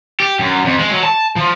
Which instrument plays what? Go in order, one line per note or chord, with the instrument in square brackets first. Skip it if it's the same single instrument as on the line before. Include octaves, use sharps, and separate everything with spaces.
[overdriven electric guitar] G4
F#2
F2
G#3
F#3
A5
F3